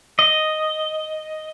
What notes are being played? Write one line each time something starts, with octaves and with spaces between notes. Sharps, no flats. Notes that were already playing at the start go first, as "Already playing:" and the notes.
D#5